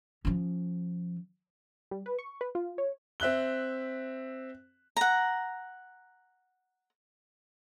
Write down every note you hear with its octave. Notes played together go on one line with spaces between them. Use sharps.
F3 C#4
G3
B4
C#6
B4
F4
C#5
C4 E5 F#6 G7
F#5 A#5